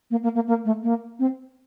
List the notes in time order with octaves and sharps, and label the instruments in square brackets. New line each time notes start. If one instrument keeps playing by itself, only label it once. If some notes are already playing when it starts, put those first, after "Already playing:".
[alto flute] A#3
A#3
A#3
A#3
A3
A#3
C4